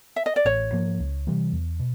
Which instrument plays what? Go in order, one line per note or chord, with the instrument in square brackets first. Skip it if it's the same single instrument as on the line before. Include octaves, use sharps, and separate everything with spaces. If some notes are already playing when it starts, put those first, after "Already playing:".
[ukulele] E5
D#5
D5
[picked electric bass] A1 [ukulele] C#5
[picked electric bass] G#2 F3 A#3
C#2
C3 E3 G3
E2
B2